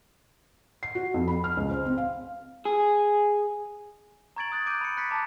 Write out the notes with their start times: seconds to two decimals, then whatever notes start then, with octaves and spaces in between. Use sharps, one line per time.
0.83 C7
0.95 F#4
1.14 F2
1.28 B5
1.44 F6
1.57 C#2
1.71 C5
1.85 C4
1.98 F5
2.65 G#4
4.36 A#5 C#6 G#6 A6 D7 F#7
4.52 D#6 F#6 A6
4.66 D6 F#6 G6 A6 D7 D#7
4.81 B5 C#7
4.97 B5 F#6 A6 B6 C#7
5.10 A5 A#5 D6 A6